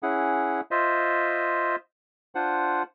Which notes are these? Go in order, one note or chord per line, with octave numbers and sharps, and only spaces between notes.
C#4 E4 G#4 F#5
F4 C5 D#5 E5
D4 F4 C5 F#5